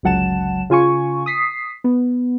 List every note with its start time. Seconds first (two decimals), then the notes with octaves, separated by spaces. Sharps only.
0.03 G1 C#2 F#3 F#5 A5 E7
0.70 C#3 F4 G#5 C#6
1.26 D#6 B6 C7
1.84 B3